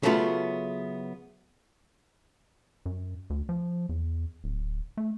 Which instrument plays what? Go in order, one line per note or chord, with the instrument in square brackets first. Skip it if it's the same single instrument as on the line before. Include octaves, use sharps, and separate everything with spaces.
[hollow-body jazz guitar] C#3 F#3 A3 B3 F4
[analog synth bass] F#2
D2
F3
E2
D1
A3